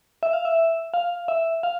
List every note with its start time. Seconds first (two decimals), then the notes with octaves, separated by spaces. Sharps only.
0.23 E5
0.33 F5
0.45 E5
0.94 F5
1.28 E5
1.63 F5